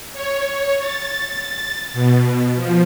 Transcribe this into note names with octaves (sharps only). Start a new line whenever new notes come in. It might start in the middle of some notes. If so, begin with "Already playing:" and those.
C#5
A6
B2
F3